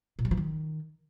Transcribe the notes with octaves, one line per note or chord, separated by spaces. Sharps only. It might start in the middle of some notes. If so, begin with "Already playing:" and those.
A#2
G3
F3
D#3